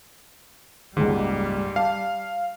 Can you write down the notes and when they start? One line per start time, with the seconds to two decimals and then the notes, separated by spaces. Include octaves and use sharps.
0.97 F#1 C#2 G#2 G3
1.76 F5 A5